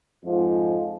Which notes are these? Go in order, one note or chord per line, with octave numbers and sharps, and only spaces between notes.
F2 G#2 F3